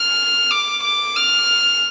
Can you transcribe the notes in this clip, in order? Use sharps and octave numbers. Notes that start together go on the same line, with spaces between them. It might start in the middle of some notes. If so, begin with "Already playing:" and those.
Already playing: F6
D6
D6
F6